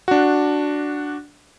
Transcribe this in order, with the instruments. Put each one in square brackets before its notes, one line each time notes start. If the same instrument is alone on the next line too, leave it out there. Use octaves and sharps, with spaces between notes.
[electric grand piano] D4 F#4